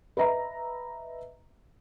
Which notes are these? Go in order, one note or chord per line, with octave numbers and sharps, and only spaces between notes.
B4 D#5 E5 A#5